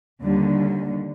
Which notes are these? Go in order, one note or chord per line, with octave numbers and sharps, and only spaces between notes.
D#2 D3 G3